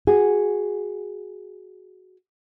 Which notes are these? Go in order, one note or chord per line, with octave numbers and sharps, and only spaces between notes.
F#4 G#4